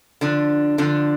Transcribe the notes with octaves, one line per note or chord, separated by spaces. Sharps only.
D3 F3 D4
D3 F3 D4